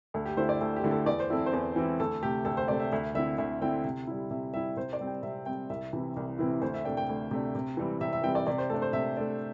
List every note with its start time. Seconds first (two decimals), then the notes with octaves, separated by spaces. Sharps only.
0.14 D2 A4
0.26 G4
0.37 D3 A3 E4 C5
0.49 D5
0.61 D2 A4
0.76 G4
0.84 D3 A3 E4
0.91 A4
1.06 E2 D5
1.20 C5
1.30 E3 C4 E4 A4
1.46 C5
1.53 E2
1.76 E3 C4 E4
1.99 D2 A4
2.22 C3 A3 G4
2.45 D2 A4
2.57 C5
2.68 C3 A3 D5
2.80 E5
2.91 D2 E5
3.15 D3 C4 E4 E5
3.38 D2 E5
3.61 D3 C4 E4 G5
3.84 C3
4.07 G3 E4
4.31 C3 E5
4.53 G3 E4 E5
4.76 C3 C5
4.93 D5
5.00 G3 C4
5.07 G5
5.23 C3 E5
5.46 G3 C4 G5
5.69 C2 E5
5.93 C3 E3 C4 E4
6.16 C2
6.38 C3 E3 C4 E4
6.61 D2 C5
6.74 E5
6.85 C3 A3 D4 G5
6.97 G5
7.09 D2
7.31 C3 A3 D4
7.55 C3
7.77 E3 G3 C4
8.01 C3 E5
8.13 E5
8.23 E3 G3 C4 G5
8.35 D5
8.47 C3 D5
8.58 C5
8.70 A3 D4 A4
8.82 C5
8.93 C3 E5
9.17 A3 D4